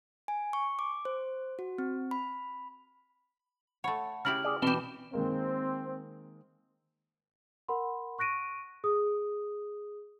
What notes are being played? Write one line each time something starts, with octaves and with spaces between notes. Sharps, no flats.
G#5
C#6
D6
C5
F#4
C4
B5
A3 C#5 F#5 B5
C#3 E4 G4 F6 F#7
G#4 D5
B2 E3 C4 G4
D#3 G#3 A#3 C4
A#4 F#5 B5 C6
C#6 F#6 A#6 D7 D#7
G#4 D#6